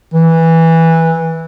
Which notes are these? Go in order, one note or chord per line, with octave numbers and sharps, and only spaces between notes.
E3